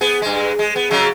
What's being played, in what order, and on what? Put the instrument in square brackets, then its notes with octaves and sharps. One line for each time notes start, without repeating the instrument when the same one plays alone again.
[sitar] B3 G#4
G2 G#3
G#3
B3
C#3 F#3 G#3